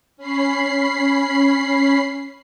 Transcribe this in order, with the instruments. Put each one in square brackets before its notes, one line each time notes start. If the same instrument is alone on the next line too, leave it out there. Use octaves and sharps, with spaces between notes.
[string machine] C#4 B5 C7